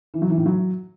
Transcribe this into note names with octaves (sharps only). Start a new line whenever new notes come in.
E3
F#3
E3
A2
F#3